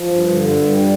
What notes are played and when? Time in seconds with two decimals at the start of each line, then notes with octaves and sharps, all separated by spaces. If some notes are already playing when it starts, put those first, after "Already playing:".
Already playing: F3
0.11 G2
0.30 D3
0.50 G2
0.69 G3